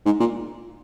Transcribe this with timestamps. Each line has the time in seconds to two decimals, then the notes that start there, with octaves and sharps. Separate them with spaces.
0.05 G#2
0.20 A#2